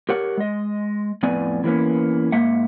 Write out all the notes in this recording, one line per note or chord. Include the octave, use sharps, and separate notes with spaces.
G4 A#4 C#5 F#5
G#3 D#5
F2 A2 B3 B4 D5 G#5
E3 F#3 A#3 B3 C#4
G#2 A#3 E5 F#5